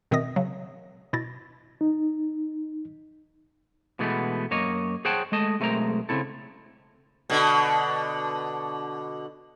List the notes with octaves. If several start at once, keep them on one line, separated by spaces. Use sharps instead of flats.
B2 D#3 C4 E5 D#6 A#6
C#3 F#3
B2 E4 A6 A#6
D#4
B2 E3 G#3 A3 B3
F#2 A#3 C#5 D#5
G#4 C5 C#5 F#5 G5 A5
G#3 A3 D#5 A5
B1 G#3 A3 C4 A#4 A#5
C#3 E3 C4 E4 A4
B2 D3